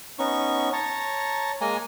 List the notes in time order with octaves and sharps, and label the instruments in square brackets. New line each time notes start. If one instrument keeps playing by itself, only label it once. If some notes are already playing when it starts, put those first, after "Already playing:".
[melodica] B3 C#4 D#4 C#6
C#5 A5 A#5
G#3 A#3 G#5 A#5